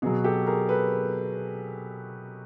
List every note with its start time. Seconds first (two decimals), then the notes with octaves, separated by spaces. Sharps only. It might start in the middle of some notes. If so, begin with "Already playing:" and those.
0.02 B2 F#3 F#4 G#4
0.24 G4 A4
0.47 G#4 A#4
0.69 A4 B4